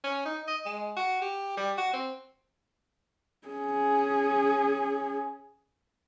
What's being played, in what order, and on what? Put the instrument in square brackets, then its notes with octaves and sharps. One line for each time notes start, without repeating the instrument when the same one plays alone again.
[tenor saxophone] C#4
D#4
D#5
G#3
F#4
G4
G3
F#4
C4
[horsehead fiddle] C#4 G#4